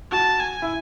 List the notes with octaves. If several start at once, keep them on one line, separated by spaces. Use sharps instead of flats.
F#4 A5
G#5
E4